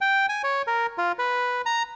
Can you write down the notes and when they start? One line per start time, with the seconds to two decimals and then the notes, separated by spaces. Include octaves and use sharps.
0.01 G5
0.29 G#5
0.43 C#5
0.67 A#4
0.98 F4
1.19 B4
1.66 A#5